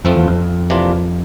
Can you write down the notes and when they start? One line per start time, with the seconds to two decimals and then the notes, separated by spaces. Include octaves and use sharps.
0.05 F2 F3 A3 C4 F4
0.16 E2
0.28 F2
0.70 C3 E3 A#3 D4 F4